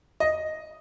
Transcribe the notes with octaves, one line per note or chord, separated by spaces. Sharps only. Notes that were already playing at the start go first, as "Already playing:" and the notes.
D#5